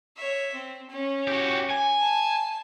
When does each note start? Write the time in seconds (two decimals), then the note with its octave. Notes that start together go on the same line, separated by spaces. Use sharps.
0.16 C#5 E5
0.54 C4
0.90 C#4
1.27 F#4 G4
1.70 G#5
2.01 A5